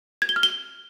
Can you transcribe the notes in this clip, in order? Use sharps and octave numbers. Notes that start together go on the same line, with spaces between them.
G#6
G7
F6
G7